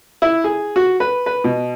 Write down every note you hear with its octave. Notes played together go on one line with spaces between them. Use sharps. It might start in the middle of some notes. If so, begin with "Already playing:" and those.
E4
G#4
F#4
B4
B4
B2